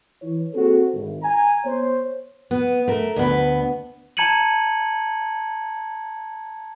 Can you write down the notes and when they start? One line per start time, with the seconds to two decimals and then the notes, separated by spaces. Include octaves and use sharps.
0.21 E3 C#5
0.53 A#3 C4 F#4 G#4 A4
0.92 G#1
1.23 G#5 A#5
1.64 B3 C5 C#5
2.51 B3
2.88 A3 A#4
3.16 D2 B3
4.17 A5 A#5 G#6 C#7 D#7 F#7